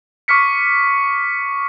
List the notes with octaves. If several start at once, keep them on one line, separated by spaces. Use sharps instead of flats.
C#6 D6 F6 B6 C#7